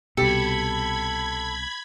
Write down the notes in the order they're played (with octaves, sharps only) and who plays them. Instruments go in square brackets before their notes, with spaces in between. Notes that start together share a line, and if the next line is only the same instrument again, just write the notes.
[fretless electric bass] C2 B2 [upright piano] G4 [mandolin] A4 [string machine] B5 G#6